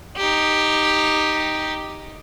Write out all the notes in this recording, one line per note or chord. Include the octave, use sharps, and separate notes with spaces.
D#4 G4